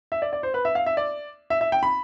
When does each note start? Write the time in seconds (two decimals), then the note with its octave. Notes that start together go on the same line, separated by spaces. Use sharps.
0.12 E5
0.22 D5
0.33 D5
0.43 C5
0.54 B4
0.65 E5
0.75 F5
0.86 E5
0.97 D5
1.50 E5
1.61 E5
1.72 G5
1.83 B5